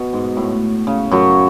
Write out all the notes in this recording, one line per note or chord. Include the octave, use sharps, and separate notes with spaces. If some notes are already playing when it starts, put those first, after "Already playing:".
Already playing: B2
G#2
A2
C#3
F#2 F#3